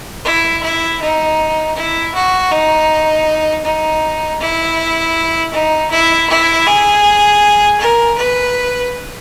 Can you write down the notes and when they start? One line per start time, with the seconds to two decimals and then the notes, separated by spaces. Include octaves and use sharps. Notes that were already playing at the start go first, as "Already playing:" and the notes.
0.25 E4
0.63 E4
1.01 D#4
1.76 E4
2.14 F#4
2.51 D#4
3.65 D#4
4.40 E4
5.53 D#4
5.91 E4
6.30 E4
6.67 G#4
7.80 A#4
8.18 B4